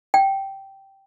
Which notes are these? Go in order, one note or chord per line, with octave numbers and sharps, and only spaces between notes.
G5